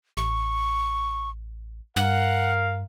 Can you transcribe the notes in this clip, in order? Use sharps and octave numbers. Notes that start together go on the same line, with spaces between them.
A1 C#6
G2 A#4 F5 F#5